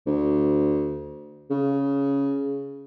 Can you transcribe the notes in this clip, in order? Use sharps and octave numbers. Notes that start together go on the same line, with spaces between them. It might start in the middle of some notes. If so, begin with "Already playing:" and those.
D2
C#3